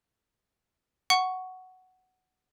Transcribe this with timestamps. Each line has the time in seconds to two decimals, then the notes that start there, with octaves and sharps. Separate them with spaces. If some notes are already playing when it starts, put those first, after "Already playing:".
1.10 F#5 C#6